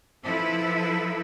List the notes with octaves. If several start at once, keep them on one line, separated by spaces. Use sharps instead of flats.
F3 E4 A4 B4